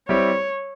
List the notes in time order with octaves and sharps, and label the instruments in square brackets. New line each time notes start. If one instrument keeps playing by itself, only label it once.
[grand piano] G3 C4 E4 G4 [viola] C#5